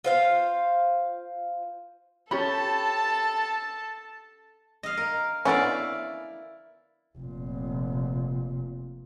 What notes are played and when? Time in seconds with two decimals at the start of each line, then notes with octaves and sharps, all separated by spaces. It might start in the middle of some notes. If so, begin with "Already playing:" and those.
0.04 F4 C5 F5
2.31 C#4 G4 A4 A5 B5
4.83 D#5 F5
4.97 A#4
5.45 D3 B3 C#4 E4 D5 F5
7.18 F1 A#2